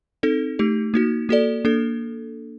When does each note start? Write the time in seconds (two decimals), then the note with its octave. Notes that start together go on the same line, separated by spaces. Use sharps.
0.23 C4 D#4 A4
0.59 A3 D#4 G4
0.94 A#3 D#4 F#4
1.29 A#3 F#4 A4 D5
1.65 A#3 D4 A4